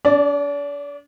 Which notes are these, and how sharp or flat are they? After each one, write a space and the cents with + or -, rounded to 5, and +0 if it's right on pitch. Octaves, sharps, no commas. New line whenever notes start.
D4 -40 D5 +0